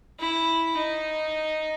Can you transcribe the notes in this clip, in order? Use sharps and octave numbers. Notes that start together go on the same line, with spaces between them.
E4
D#4